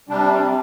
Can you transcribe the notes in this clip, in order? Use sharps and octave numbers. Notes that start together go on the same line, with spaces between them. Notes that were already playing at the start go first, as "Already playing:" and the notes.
C3 G3 D4